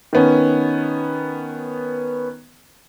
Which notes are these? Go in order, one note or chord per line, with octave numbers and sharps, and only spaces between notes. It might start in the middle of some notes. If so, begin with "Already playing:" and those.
D#3 B3 C#4